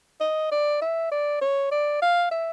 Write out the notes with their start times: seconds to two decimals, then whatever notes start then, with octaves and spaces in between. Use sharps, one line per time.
0.21 D#5
0.51 D5
0.82 E5
1.12 D5
1.41 C#5
1.71 D5
2.02 F5
2.31 E5